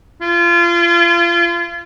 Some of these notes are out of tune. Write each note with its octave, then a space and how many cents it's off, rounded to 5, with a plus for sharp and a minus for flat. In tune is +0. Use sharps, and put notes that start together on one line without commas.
F4 -30